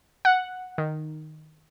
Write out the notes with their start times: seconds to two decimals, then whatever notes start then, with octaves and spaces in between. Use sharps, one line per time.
0.25 F#5
0.78 D#3